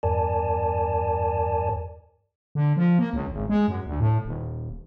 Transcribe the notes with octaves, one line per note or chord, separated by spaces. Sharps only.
E2 G2 A#4 D5 G#5 A5
D3
F3
A#3
C#2
G#1
G#3
F#2
D2
A2
D#1